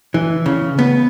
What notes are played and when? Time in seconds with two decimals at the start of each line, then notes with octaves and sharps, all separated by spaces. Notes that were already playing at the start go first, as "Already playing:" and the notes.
0.14 E3
0.46 C#3
0.79 B3